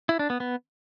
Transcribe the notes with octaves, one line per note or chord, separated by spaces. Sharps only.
E4
D4
B3
B3